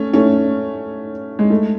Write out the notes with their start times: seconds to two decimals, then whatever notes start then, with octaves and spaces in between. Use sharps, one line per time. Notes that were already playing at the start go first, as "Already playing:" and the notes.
Already playing: A3 C#4
0.14 A3 C#4
1.39 G#3
1.50 A3